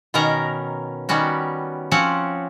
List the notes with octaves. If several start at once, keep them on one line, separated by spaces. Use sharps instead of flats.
B2 D#3 B3 C#4 A#4 A#5
D#3 G3 B3 C#4 F#4
F3 C4 C#4 F#5